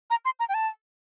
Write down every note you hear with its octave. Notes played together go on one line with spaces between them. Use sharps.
A#5
C6
A#5
G5
A5